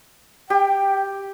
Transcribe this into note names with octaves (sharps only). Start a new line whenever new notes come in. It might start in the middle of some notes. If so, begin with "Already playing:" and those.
G4 G5